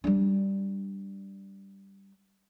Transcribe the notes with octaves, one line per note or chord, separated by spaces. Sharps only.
G3 D4